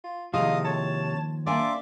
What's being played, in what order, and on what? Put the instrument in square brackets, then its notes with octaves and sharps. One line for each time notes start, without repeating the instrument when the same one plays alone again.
[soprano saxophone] F4
[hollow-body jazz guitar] D#2 F3 [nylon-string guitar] C3 E4 G#4 [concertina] D#5 D#6 [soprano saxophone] F5
[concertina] C#5 [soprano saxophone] A5
[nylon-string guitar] A#3 D4 G#5 [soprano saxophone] D5 [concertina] E5 C6 D6